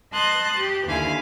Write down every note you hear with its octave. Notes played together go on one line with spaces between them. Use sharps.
D#5 A5 C6 D#6 F#6 A6
G4
D#2 D3 E4 F5 G#5